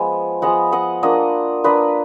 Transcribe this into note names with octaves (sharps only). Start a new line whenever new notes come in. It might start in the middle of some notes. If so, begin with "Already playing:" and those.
Already playing: F3 G#3 B3 F4
F3 G#3 B3 D#5 F#5
D#5 F#5
A#3 D4 F4 D#5 F#5
A#3 D4 F4 B4 D#5